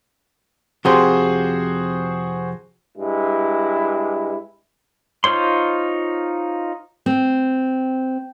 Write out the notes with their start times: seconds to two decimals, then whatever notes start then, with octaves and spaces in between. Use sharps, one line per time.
0.85 F2 C3 F#4 G#4 C5 C6
2.97 G2 G#3 E4
5.24 D#4 F4 C5 C#5 C6
7.06 C4